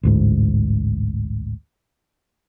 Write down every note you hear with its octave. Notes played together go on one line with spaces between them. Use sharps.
A1 D2 G#2